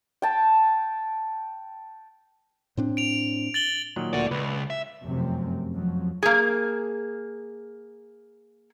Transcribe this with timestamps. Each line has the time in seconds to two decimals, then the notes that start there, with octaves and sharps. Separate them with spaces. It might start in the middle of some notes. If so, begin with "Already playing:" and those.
0.22 G5 A5
2.77 A2 C4 D4
2.97 D7 F7
3.54 A6 F#7 G7
3.96 A#2 D#3 F#3
4.13 D2 A#2 F#4 A4 D5
4.31 C#2 B4 D5
4.70 E5
5.09 F1 F#2 C3 C4
5.75 F2 F3 F#3
6.23 A#3 G#4